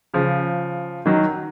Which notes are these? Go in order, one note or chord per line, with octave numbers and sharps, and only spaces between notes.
C#3 F3
D#3 F#3